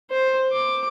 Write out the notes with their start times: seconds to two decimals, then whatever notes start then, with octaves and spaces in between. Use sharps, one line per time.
0.11 C5
0.53 D6